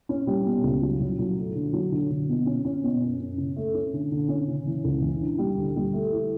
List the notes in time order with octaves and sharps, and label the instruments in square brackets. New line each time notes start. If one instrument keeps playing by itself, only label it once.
[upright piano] C#4
G3
B2
C#2
F#3
F#3
F#3
A3
D3
F#3
D3
D3
B2
C#4
C#4
B2
F#2
F#2
C#3
A3
C#4
D3
D3
C#4
C#3
E3
C#2
E3
D4
G3
D2
G3
A3
E4